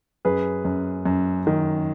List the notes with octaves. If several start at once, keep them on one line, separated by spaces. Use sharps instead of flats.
F#2 G#4 B4
F#2
F#2
D#3